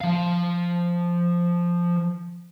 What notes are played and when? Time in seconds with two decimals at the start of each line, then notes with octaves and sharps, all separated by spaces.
0.01 F3 F5